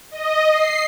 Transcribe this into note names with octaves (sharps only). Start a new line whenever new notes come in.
D#5
C7